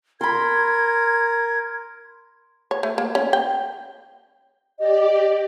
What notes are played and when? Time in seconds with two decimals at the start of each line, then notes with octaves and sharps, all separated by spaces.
0.21 A#4 B5 C6 G#6
2.71 C#5
2.83 A3
2.98 A#3
3.15 C#4
3.33 G5
4.79 G4 D5 D#5